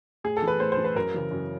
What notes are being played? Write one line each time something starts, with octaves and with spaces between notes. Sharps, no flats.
A2 G#4
A4
E3
B4
A2 C5
C5
E3
B4
F#2 A#4
C#3 E3
F#2